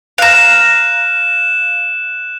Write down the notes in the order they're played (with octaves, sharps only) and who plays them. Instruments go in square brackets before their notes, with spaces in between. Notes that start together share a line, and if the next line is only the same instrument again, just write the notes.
[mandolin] F5 A#5 [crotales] F#6 E7